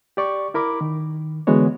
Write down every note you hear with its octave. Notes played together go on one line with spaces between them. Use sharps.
G4 D5 C#6
E4 A#4 B5 D6
D#3
D3 E3 G#3 B3 F#4 C#5